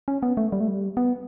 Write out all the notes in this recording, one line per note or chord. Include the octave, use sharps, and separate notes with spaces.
C#4
B3
A3
G3
A3
G3
B3